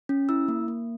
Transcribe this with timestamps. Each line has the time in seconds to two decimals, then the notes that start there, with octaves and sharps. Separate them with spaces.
0.09 C#4
0.29 E4 E6
0.48 A#3
0.68 A#3